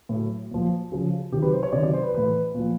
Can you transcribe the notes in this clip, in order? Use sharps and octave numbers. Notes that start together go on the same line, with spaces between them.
A2 F#3
A#2 F3
C#3 F3
C3 D#3 F#3 G4
B4
C5
C#5
C3 D#3 F#3 D5
D5
C5
B4
A2 E3 B4
A#2 F3